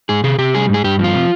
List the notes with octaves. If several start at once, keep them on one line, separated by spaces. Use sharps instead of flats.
G#2 G#4
C3 G#4
C3 G4
G3 G#4
G#2
G#4
G2 G4
F3
F4
C3